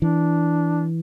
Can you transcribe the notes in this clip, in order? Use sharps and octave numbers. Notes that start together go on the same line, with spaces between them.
E3 D4